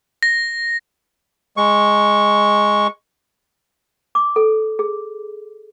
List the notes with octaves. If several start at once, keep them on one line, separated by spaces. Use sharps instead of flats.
A#6
G#3 C#6
D6
A4
G#4